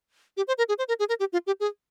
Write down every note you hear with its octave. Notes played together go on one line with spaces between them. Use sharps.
G4
C5
A#4
G#4
C5
A#4
G#4
A#4
G4
F4
G4
G#4